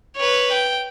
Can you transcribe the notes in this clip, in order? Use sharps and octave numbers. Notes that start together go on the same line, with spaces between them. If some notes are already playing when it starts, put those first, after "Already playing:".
B4 C#5
G5